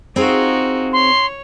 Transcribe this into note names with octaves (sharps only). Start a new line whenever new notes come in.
C4 D#4 F4 F#4 G#4 C5
C#5 C6